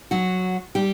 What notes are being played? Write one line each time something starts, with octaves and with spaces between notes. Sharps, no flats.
F#3 F#4
G3 G4